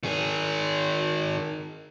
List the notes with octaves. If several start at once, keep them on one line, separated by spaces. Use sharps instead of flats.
D#3 G#4